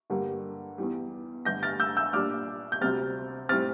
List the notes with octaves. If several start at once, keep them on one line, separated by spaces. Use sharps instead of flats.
G2 D3 G3 A#3
E2 E3 G3
G2 D3 G3 G6 A#6
F6 A6
E6 G6
E6 G6
A#2 G3 D4 D6 F6
G6
D2 C3 G3 C4 F6 A6
A2 G3 C4 F6 A6